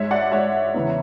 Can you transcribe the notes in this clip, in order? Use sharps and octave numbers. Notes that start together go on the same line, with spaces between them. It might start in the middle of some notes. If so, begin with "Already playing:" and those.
Already playing: G#2 G#3 C#5 E5
D5 F#5
G#2 G#3 C#5 E5
E2 C#3 E3